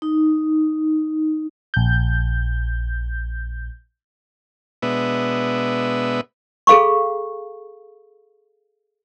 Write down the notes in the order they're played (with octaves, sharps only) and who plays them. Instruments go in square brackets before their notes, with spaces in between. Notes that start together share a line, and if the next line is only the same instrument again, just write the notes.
[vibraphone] D#4
[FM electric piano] A#1 G6
[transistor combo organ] B2 G#3 B3 D4 B4 E5
[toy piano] G#4 A4 F5 B5 C#6